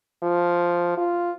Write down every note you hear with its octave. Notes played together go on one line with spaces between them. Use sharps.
F3
F4